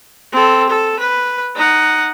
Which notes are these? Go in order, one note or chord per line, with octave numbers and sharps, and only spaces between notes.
C4 A4
A4
B4
D#4 F#5